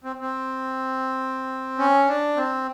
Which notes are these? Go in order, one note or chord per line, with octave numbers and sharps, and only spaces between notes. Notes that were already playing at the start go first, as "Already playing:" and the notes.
C4
C4
C#4
D4
C4